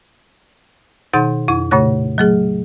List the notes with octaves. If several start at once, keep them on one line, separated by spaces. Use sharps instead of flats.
B2 D#3 D#4 F#5 G6 A6
F2 E4 C#6
A#2 C#3 A3 C#5 F#6
F#3 A3 G#4